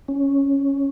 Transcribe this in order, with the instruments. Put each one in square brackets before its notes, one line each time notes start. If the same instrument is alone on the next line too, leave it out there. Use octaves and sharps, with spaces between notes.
[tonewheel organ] C#4